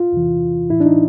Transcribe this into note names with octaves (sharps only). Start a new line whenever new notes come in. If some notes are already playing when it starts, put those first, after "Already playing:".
Already playing: F4
E2 C3 E3
A2 E3 E4
D4
D#4